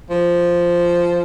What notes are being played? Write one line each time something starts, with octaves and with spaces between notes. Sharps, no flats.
F3